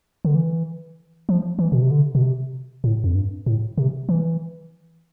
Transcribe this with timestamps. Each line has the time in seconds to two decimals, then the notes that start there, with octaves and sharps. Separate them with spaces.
0.25 D3
0.35 E3
1.29 F3
1.59 E3
1.72 B2
1.82 C3
1.91 D3
2.15 B2
2.22 C3
2.84 A2
3.04 F2
3.15 G2
3.46 A2
3.78 C3
4.09 E3